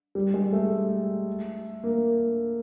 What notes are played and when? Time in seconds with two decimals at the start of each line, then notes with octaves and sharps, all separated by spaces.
0.15 G3
0.34 G#3
0.52 A3
1.84 A#3